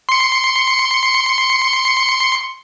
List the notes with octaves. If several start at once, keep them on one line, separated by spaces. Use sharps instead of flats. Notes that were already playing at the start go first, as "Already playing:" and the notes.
C6 C#7